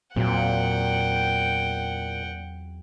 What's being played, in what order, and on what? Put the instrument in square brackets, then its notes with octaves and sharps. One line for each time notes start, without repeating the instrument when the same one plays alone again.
[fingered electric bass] E2 F#3 C4 [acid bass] A#2 [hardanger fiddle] F#5 G5